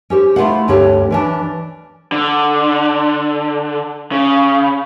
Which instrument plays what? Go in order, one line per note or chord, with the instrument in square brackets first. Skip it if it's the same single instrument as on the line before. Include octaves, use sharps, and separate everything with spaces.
[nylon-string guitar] C#4 G4 C5
A3 E4 F4 C5 F5 F#5
D2 G2 D3 C#4 G4 C#5
E3 C#4 D4
[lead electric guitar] D3
C#3